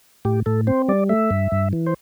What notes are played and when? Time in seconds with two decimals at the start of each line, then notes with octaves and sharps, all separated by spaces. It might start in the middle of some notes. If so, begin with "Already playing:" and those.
0.25 A2 G4
0.46 A2 A4
0.67 C4 C5
0.88 G3 D5
1.09 A3 E5
1.31 G2
1.52 G2
1.73 E3
1.87 C5